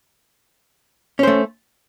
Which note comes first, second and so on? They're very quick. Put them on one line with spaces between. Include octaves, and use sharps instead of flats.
C#4 C5 A3